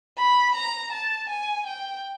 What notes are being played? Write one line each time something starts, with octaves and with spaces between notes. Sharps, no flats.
B5
A#5
A5
G#5
G5